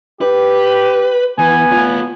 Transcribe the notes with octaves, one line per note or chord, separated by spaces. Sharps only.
G4 B4
E3 B3 G#5
A3 F4